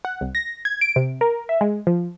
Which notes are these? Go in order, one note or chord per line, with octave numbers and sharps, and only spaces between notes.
F#5
C2
A#6
G#6
D7
C3
A#4
E5
G#3
F3